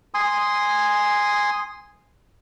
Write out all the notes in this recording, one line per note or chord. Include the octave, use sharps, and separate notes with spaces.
G#5 C6 D#6